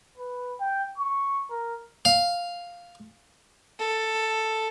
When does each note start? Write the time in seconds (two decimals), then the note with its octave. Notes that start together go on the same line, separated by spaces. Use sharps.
0.17 B4
0.60 G5
0.98 C#6
1.50 A#4
2.05 F5
3.79 A4